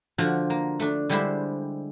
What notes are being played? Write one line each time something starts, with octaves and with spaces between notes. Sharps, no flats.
D3 F3 F4 F#4
A#3
A3 D4
D3 G3 G#3 E4 G4 C5